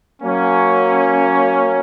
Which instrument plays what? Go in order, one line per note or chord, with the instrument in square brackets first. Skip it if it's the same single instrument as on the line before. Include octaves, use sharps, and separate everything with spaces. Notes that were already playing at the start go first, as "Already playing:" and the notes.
[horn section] F#3 A#3 C#4